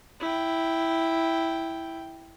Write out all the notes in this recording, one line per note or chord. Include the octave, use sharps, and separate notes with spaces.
E4 G5